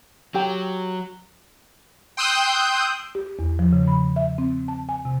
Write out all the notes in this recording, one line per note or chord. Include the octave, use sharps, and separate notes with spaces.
F#3 G4 G5
G5 C6 D#6 E6 F#6 G6
G4
E2
F3
C#3
B5
E5
C4
A5
G#5
C3